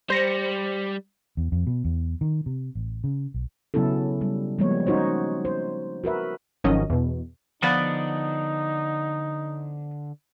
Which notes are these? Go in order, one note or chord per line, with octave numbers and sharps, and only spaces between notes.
G3 C5 A#6 C#7
E2
F2
B2
E2
D#3
C3
A1
C#3
B1
C#3 F#3 B3 C#4 E4 A4
G3
F3 G3 G#3 A#3 B3 C#5
C#4 D#4 F#4 C5 C#5
C5
F#4 A#4 B4 E5
G#1 D#3 F3 F#3 C#4 D#5
E2 B2
D3 F3 B3 D#4 D5